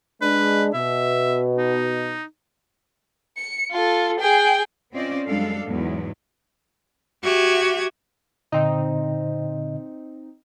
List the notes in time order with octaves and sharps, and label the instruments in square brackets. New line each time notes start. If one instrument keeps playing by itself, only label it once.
[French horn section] G#3 D4 [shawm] B4
[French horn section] B2 [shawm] E5
[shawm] D#4
[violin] C#7
F4 A4
G#4 G5
[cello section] C4 C#4 F4 C5 D5 D#5
F#2 G3 G#3 D4 A4 F5
E2 G#2 F#3 B3
[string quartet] F#4 G4 E5 G#6
[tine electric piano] A#2 D3 D#5 [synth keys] C4 D#4